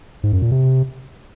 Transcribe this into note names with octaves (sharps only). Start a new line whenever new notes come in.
G#2
F#2
A#2
C3